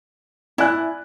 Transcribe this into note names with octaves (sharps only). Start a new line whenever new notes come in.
E4 D5 G#5 F#6